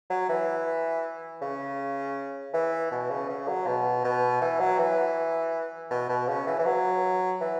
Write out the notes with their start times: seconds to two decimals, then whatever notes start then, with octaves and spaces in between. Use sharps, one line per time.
0.10 F#3
0.29 E3
1.41 C#3
2.54 E3
2.92 B2
3.09 C#3
3.29 C#3
3.48 F#3
3.67 B2
4.04 B2
4.42 E3
4.60 F#3
4.78 E3
5.91 B2
6.09 B2
6.28 C#3
6.47 E3
6.59 E3
6.65 F#3
7.41 E3